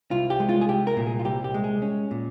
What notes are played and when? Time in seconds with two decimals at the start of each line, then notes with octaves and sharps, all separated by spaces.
0.11 C2 F4
0.30 G4
0.40 G#3
0.49 F4
0.61 G#4
0.68 C2 G4
0.87 A#4
0.97 A#2
1.06 G#4
1.19 F4
1.25 C2 G4
1.44 G4
1.54 G#3
1.64 G#4
1.82 C#4
2.11 A#2